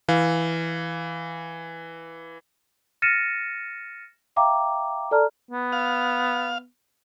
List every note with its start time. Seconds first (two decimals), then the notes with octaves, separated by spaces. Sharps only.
0.08 E3 F5
3.02 F6 A6 A#6 C#7 D#7 E7
4.36 E5 F5 G5 A#5 D6
5.11 A4 D5 A5 A#5 F6
5.51 B3
5.72 F5